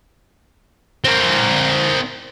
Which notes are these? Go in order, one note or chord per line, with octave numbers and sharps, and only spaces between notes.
C4 A#4